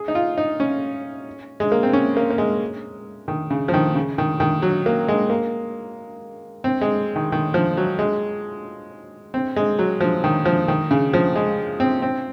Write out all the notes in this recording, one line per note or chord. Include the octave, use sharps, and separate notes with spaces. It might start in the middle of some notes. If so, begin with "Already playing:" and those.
Already playing: G#4
D#4
F4
D#4
C#4
G#3
A#3
C4
C#4
A#3
A#3
G#3
D#3
C#3
F3
D#3
C#3
D#3
D#3
F#3
A#3
G#3
A#3
C4
G#3
D#3
D#3
F3
F#3
G#3
C4
G#3
F#3
F3
D#3
F3
D#3
C#3
F3
G#3
C4
C4